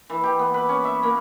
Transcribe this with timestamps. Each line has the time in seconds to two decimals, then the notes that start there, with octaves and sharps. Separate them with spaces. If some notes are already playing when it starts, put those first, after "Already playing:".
0.10 E3
0.24 G4
0.39 B3
0.54 B4
0.69 C#4
0.84 E5
1.03 A#3